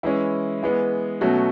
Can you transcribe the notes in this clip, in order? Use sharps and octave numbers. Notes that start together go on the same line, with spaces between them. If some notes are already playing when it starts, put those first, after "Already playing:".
E3 G#3 C#4 E4
E3 G#3 B3
B2 F#3 A3 C#4 F#4